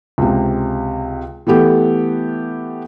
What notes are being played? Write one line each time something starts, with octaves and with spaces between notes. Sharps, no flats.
C#2 C3
E3 A3 B3 G4 A4